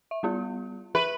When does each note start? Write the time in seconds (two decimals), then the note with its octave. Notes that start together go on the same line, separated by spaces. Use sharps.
0.11 E5
0.23 G3 B3 F4
0.95 B4 E5